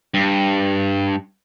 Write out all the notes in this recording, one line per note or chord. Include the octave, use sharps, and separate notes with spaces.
G2